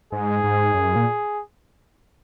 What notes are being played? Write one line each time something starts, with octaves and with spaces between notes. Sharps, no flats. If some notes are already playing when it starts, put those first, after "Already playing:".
G#2 G#4
G#2
F#2
A#2